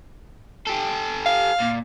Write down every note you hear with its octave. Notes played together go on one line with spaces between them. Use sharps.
G4 A4
F5
A#2